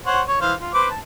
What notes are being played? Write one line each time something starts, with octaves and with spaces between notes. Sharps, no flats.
C5 C#5 F#5
C#5
E3 C5 F5
F4
B4 C5 D6
A5